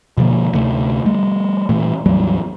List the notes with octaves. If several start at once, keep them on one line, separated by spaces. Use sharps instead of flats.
B2 D3 F3 A#3
D2 C3 A3
G3 A3
A#2 E3 A3
A1 E2 F#3 G3